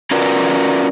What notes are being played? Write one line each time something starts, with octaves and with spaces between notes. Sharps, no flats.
C#4 F4 F#4 A#4 B4 D5